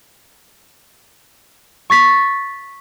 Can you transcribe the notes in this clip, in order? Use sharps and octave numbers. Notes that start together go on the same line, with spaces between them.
C#6 A6 B6